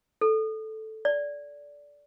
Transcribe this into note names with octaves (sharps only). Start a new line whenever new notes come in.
A4
D5